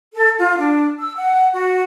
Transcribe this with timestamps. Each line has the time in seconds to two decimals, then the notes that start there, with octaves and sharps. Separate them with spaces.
0.14 A4
0.37 F4
0.57 D4
0.98 E6
1.15 F#5
1.53 F#4